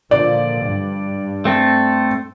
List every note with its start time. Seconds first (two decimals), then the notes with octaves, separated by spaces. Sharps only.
0.11 A#2 D3 F3 D5
0.66 G2
1.45 A3 C4 A4